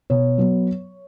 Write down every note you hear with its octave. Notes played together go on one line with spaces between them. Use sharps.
B2 C#5
F#3 B3